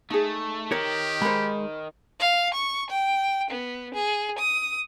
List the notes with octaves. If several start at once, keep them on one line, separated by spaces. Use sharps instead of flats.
A3 D#4 G#4
D#3 G4 A#4 C#5
G#3 A#4 C5 B5
F5
C#6
G5
B3
G#4
D#6